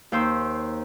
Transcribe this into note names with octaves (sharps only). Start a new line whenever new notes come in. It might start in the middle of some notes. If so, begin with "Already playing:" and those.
D#2 C5 E6